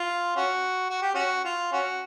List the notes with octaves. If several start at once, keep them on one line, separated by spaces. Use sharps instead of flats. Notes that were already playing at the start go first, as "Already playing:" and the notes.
Already playing: F4
C#4 F#4
F#4
G4
C#4 F#4
F4
C#4 F#4